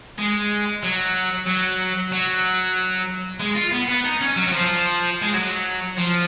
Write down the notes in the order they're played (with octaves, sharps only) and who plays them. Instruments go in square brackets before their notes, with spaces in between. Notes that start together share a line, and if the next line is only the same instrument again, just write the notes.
[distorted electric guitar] G#3
F#3
F#3
F#3
G#3
F4
B3
B3
D#4
C#4
F#3
F#3
F3
G#3
F#3
F3